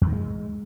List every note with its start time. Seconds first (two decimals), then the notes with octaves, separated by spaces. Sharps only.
0.01 E2
0.07 D#3
0.13 G#3